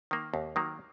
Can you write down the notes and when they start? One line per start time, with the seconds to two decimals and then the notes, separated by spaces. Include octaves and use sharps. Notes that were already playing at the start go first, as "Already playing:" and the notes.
0.11 D#3 A#3
0.34 D#2
0.56 D#3 F#3 A#3